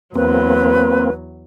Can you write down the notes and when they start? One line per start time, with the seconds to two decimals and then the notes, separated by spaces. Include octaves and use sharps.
0.16 E2 F#3 A#3 C4 B4